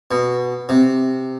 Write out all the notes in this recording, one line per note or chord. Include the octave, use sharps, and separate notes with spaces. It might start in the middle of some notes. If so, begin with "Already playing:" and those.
B2
C3